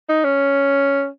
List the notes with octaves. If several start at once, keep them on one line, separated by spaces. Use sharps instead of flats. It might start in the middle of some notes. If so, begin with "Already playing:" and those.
D#4
C#4